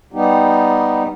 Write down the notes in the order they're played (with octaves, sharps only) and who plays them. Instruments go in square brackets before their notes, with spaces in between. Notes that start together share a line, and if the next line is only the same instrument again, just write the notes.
[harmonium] G3 B3 D#4 G4